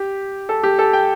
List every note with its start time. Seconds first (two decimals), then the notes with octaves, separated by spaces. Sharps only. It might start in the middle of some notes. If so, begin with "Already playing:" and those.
Already playing: G4
0.49 A4
0.63 G4
0.79 A4
0.93 G5